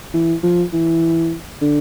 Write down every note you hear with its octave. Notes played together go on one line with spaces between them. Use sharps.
E3
F3
E3
D3